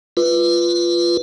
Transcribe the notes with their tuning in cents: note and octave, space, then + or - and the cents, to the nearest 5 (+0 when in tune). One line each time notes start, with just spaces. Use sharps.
F4 -10 B4 +0